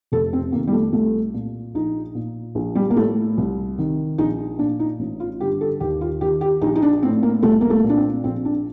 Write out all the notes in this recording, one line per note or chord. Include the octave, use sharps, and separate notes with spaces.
F1 A4
C4
F2 D#3 A#3
G3
A3
C2 A3
A#2
A#1 D#4
A#2
A#1
G3
A#3
A2 A3
C2
C3 D#3
A#1 D#4
A#2 D4
D#4
A1
F4
G2 D3 G4
A4
D#2 G4
F4
D#3 G4
G4
A#1 D#4
D#4
D4
A2 C4
A#3
C2 A3
A#3
A3
A#2
D4
C4
A#1 C4
D4